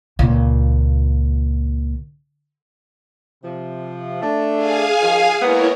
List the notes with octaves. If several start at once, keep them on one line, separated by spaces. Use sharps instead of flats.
C#2 A#2
C3 F3
A3 D4
G#4 F5 G#5
D#3 F3
G#3 A#3 B3 E4 A#4 C#5